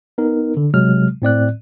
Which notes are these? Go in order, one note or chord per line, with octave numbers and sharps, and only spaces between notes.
B3 D#4 A#4
D3
C3 F#3 G#3 F6
A2 C4 D5 F#6